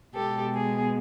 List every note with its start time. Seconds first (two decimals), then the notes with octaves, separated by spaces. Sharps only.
0.14 B2 G#3 B3 G4 A4
0.55 G#4